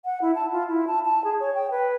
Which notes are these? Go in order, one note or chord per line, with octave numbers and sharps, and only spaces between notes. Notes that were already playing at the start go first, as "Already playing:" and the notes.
F#5
E4
A5
F4
E4
A5
A5
G#4
C#5
G5
B4